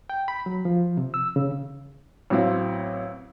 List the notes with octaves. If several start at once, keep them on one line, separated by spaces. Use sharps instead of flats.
G5
B5
F#3
F3
C3
E6
C#3
A1 F#3 C4 E4 F5